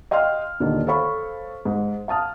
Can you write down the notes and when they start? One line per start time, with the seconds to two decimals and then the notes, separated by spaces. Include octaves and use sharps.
0.11 D#5 F5 G5 C6 F6
0.60 D#2 A#2 D3 D#3
0.87 A4 C5 C#5 F5 B5 C#6
1.65 G#2
2.08 F5 A5 D#6 F6